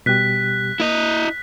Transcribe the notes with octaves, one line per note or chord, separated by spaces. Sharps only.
B2 G3 G4 F#6 B6
A#3 E4 D#5